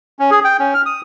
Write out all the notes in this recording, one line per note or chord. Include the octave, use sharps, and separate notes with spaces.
C#4
G#4
G5
C#4
F6
D#6